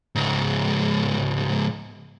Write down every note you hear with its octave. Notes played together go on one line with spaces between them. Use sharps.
C#2 G#2